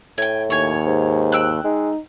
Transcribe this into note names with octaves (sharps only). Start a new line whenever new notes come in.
A2 G5 G#5
D#2 C#5 G#5
G#2
G5 E6 F#6
G#3 D#4